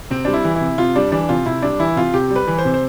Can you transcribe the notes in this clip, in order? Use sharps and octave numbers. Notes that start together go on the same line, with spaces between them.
C3 C4
G3 D4
E4
E3
E4
C3
C3 F4
G3 D4
E3 D4
C3 F4
C3 E4
G3 D4
E3 E4
C3 F4
C3 G4
G3
B4
E3
C5
C3
C5